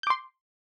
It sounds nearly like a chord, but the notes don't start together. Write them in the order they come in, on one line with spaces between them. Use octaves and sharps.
G6 D6 C6